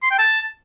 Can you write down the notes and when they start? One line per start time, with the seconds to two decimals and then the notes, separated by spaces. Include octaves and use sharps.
0.03 C6
0.11 G5
0.19 A5